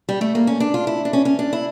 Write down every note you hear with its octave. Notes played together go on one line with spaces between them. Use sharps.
G3
A3
A#3
C#4
D4
F4
E4
D4
C#4
C#4
D4
E4